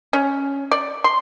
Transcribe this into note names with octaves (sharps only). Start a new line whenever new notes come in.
C#4
D5
C6